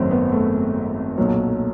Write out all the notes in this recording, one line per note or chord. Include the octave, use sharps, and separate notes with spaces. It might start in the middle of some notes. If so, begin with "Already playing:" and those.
Already playing: G#1 F#2 D#3 F#3 A3 C4
B3
A3
B1 A#2 F#3